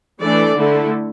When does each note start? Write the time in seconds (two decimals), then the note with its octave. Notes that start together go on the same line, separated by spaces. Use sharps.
0.20 E3 A3 D4 A4 D5
0.57 D3 A3 E4 A4